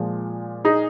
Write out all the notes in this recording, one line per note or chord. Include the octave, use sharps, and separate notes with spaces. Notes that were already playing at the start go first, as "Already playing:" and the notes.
Already playing: A#2 F3 G#3
D#4 G#4